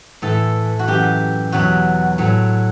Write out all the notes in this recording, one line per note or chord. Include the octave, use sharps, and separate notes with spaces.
A2 E3 A4
F#4
F#2 E3 G4
E2 B2 F#3 F#4
A2 F#3